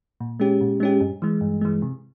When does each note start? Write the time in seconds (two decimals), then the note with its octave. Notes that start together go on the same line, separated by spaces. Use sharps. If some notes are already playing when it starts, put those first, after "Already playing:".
0.20 A#2
0.40 G#3 C#4 G4
0.61 A#2
0.80 G#3 C#4 G4
1.00 G2
1.22 E3 G#3
1.41 G2
1.61 E3 G#3
1.82 C3